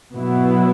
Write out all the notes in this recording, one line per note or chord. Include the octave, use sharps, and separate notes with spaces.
B2 F#3 B3 E4